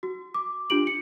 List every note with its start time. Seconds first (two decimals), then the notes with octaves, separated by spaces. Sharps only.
0.03 F#4
0.34 D6
0.70 D4 F4 G4 D7 F#7
0.87 C#7